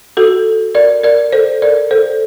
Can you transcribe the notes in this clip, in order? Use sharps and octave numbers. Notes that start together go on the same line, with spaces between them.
F#4 A4
A#4 D5
A#4 D5
A4 C5
A#4 D5
A4 C5